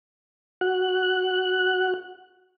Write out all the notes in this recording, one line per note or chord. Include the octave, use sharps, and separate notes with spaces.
F#4 F#6